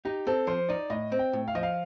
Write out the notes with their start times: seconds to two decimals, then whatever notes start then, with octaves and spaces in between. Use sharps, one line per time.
0.05 D#4 G4
0.27 C4 A4
0.47 F3 C5
0.69 D#4 D5
0.90 A2 D#5
1.12 C4
1.19 G5
1.33 A2
1.48 F5
1.55 F3 D#5
1.63 F5